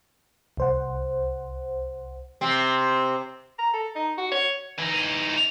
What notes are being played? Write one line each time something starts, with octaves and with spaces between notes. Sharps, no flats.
C2 C5 F#5
C3 C4
A#5
A4
D#4
F#4
C#5
E3 D#4